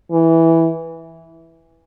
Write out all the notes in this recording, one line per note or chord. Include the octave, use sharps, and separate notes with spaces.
E3